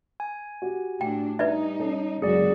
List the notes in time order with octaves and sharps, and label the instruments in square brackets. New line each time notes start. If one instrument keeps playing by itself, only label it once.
[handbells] G#5
[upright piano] F#4 G4
[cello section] A2 D4 [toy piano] G5
[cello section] G3 D#4 [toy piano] B4 D5 E5
[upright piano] C#4 A4
[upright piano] F#1 G#3 [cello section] C#3 F#3 F#4 [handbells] G#4 D5